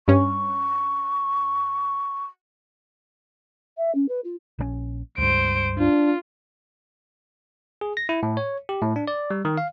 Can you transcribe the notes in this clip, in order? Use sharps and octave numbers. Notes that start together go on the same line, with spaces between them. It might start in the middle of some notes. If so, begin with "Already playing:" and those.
G2 C#4 C#6
E5
C#4
B4
F4
A#1 D#3 C#4
C#2 G2 C5 D7
D4 F4
G#4
A#6
E4
A2
C#5
G4
A2
D4
D5
G3
D#3
F5